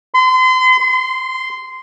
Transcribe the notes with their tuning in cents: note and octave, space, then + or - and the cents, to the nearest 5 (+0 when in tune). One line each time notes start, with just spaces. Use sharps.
C6 -35
C6 -10